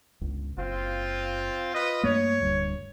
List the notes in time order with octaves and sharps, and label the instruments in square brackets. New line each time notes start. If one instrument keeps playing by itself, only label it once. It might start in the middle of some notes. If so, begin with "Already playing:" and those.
[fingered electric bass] G1 C#2
[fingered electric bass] F#1 [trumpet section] C4 F4
[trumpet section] F4 B4 D#5
[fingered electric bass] G2 A3 A#3 [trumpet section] C#5
[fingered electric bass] D1 D2 G2